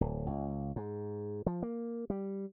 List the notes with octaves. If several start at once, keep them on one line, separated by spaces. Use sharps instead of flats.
D1
C#2
G#2
F3
A#3
G3